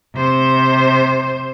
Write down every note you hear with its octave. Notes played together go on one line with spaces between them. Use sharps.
C3 C5